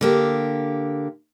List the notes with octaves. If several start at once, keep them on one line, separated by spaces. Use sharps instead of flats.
D3 A#3 G4